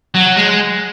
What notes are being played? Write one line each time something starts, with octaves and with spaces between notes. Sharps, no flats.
F#3
G#3